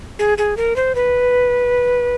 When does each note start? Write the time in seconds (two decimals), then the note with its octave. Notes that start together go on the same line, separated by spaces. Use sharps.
0.19 G#4
0.38 G#4
0.57 A#4
0.76 C5
0.95 B4